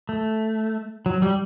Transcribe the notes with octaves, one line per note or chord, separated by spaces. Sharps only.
A3
F#3
G3